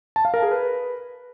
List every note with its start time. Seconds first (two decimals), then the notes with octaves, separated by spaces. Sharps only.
0.16 A5
0.25 F5
0.34 A#4
0.42 G#4
0.51 B4